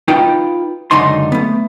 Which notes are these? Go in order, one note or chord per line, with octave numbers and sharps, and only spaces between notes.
D#4 F4 B4 G5
C#2 F#2 D3 D#4 C6
A3 B3